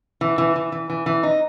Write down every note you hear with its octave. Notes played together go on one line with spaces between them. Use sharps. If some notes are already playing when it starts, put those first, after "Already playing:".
E3
E3
E3
E3
E3
E3
D#4